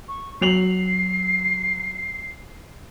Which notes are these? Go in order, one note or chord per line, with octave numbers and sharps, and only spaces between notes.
C#6
F#3 C7 F7 F#7